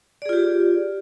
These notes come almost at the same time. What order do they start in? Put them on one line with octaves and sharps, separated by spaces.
D5 G#4 F4 G4